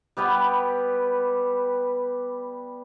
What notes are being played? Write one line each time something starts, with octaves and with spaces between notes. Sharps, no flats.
G3 B3 G4 B4